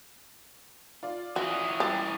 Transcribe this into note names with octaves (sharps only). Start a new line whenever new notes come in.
F4 D5
E3 C#4 F#4 D#6
G3 G4 A6